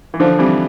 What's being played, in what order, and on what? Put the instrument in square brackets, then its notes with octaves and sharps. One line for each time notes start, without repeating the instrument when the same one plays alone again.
[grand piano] E3
[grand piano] D3 F3 [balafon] C5
[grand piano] E3 G3 [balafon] C4